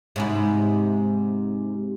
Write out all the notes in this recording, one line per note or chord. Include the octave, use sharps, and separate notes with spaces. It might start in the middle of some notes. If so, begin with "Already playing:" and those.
G#2 C3 E4